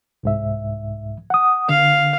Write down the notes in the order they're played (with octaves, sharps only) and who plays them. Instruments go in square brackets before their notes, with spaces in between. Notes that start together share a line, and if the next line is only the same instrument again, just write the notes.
[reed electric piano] C2 G#2 E5
F#5 D#6
[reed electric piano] D3 [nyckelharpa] F5